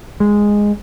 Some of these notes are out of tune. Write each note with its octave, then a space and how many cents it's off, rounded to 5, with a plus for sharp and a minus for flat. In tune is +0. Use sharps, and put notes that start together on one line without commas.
G#3 -5